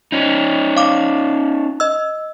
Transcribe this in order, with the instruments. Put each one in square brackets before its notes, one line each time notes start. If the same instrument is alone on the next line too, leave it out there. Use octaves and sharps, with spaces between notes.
[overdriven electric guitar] C#4 D#4
[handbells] F5 D6
D#5 E6